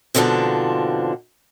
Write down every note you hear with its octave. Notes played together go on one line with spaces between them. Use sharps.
G#2 B2 D3 F3 C4 D4